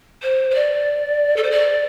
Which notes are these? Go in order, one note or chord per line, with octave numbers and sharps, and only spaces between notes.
C5
C5
D5
A4
C5
D5